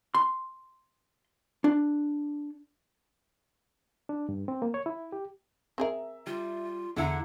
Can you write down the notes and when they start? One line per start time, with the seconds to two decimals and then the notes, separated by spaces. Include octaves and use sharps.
0.15 C6
1.64 D4
4.09 D4
4.29 G2
4.48 C4
4.62 A#3
4.74 C#5
4.86 E4
5.12 G4
5.78 C4 G#4 A#4 E5 A#5
6.27 G3 F4
6.96 E2 D3 E4 F#5 A#5